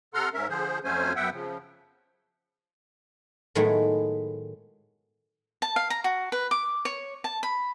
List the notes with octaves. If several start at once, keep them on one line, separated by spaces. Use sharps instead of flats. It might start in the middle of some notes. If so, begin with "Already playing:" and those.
C3 A4 F#5 A#5 C6 F6
G#2 C#4 A#4 E5
D3 F3 G#4 C5
F2 F#3 A3 C#4 C5 G#5
F#2 B3 E5 F#5 G5
C#3 F3
A2 D#3 F#3 G#3 A3 B3
A5
F5
A#5
F#4
B4
D6
C#5
A5
B5